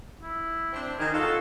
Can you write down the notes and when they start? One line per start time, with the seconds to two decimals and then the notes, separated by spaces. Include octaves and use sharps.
0.21 E4
0.73 C4 D4
0.99 D#3 G#4
1.14 F4 F#4 A4